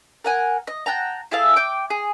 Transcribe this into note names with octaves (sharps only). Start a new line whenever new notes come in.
A#4 F#5 G#5
D#5
F#5 G5 A5 A#5
E4 G#4 A4 F5
G5 D6
G#4